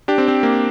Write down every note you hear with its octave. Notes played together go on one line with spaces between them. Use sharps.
D4 G4
C4
C4
A#3